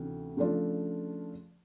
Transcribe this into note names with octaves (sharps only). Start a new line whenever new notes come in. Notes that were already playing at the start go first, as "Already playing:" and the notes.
Already playing: D2 C3 E3 A3 C#4
C#3 F3 A3 D4 F4